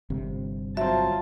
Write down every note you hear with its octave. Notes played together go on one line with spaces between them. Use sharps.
G1 C3
F#3 C4 F4 E5 A5